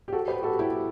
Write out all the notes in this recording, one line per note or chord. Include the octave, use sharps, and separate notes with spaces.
G4
F#4 A4
G4 B4
F#4 A4
E4 G4